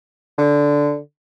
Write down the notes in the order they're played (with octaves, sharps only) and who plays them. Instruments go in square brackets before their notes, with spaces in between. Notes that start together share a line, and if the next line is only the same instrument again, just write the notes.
[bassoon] D3